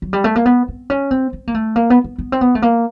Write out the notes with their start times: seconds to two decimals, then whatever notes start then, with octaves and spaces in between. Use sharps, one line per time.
0.02 F#3
0.13 G3
0.24 A3
0.36 A#3
0.46 B3
0.68 C4
0.90 C#4
1.11 C4
1.33 C4
1.47 A#3
1.54 A3
1.76 A#3
1.90 B3
2.04 B3
2.18 B3
2.32 C4
2.41 B3
2.55 A3
2.62 A#3